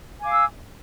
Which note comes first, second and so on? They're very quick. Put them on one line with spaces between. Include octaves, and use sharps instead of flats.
G#5 D6 F5 E6